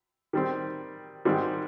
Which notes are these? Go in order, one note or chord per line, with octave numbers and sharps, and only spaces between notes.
D#3 G3 C4
G#2 D#3 G3 C4